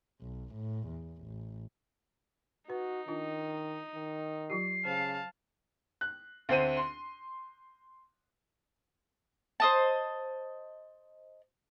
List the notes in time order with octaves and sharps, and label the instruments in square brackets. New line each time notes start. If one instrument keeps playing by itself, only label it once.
[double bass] B1
A2
E2
A1
[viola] D#4 [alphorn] F#4 [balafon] B4
[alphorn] D#3 [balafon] D4 F4
[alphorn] D#3
[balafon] F#3 F4 G4 [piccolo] C7
[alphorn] C#3 [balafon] C5 [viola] F5 A5
[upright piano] F#6
D2 C4 C5 D#7
C6
[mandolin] C5 D#5 A5